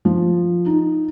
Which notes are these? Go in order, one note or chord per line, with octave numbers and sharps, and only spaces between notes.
F3
D#4